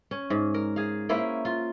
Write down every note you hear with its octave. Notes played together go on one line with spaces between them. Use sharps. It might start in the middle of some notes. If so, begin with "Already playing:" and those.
C#4
G#2
A#4
G#4 F5
A#3 C#4 E4 C5
F4